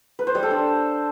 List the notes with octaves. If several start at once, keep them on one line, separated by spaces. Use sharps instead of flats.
B4
C5
G3
A4
D4